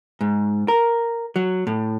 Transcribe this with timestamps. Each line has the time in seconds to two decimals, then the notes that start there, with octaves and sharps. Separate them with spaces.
0.21 G#2
0.68 A#4
1.36 F#3
1.67 A2